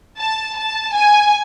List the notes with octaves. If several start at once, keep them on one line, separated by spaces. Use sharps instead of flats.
A5
A5
G#5